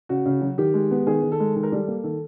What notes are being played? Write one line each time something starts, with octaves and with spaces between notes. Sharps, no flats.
C#3 F#4
C#3
F#3
D#3 G4
G#3
B3
D#3 G#4
D#3
A4
G#3
D#3 A4
A#4
G3 A4
A#3
D#3 A4